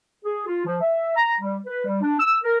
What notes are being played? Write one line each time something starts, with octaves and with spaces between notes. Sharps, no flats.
G#4
F4
F3
E5
A#5
G3
B4
G3
D4
E6
A#4